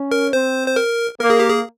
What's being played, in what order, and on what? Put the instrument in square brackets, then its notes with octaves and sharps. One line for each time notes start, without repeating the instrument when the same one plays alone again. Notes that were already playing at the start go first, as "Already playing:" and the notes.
Already playing: [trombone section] C#4
[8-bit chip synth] A#4
[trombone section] C4 [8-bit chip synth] C5
[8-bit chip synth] C5
A#4
[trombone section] A#3 [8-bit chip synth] A#4
[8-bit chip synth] G#4
G4
G#4